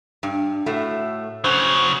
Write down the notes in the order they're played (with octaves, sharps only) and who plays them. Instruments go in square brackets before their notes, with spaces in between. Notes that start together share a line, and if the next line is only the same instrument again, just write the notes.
[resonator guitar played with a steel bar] G2
A2 A3 F#4
[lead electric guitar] C#3 F#3 [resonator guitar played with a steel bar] C#4 C5